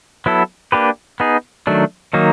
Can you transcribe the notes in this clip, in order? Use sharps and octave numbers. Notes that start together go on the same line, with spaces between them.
F#3 B3 E4 A4
A#3 D4 G4 B4
B3 D#4 G#4
D#3 F#3 A3 D4
D#3 F#3 A#3 D#4